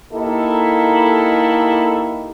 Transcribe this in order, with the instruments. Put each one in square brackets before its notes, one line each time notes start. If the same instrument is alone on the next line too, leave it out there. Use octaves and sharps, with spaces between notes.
[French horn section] A#3 D#4 E4 G4 A4